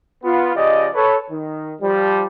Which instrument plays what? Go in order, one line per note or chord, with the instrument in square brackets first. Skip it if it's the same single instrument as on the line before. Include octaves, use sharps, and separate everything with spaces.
[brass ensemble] B3 F4
C#3 F3 G4 D5 D#5
A4 B4 C#5
D#3
F3 G3